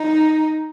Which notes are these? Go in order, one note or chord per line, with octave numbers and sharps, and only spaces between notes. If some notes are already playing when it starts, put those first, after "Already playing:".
Already playing: D#4